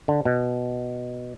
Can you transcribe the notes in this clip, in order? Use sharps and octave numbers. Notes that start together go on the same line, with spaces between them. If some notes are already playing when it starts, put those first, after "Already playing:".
D3
B2